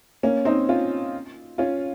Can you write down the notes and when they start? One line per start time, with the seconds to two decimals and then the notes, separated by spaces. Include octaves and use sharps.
0.23 A#3 C#4
0.45 C4 D#4
0.69 C#4 F4
1.58 C#4 F4